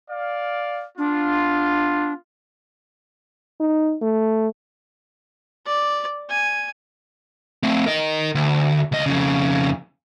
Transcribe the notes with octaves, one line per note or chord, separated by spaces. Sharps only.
D5 F5
B3 D4 F4
D#4
A3
D5
G#5
A3 C4
A#4 D#5
D2
C#2 D#5
F2 C#3